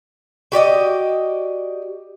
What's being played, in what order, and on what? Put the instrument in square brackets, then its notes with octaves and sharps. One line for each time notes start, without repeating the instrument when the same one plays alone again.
[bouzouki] F#4 G4 D5 D#5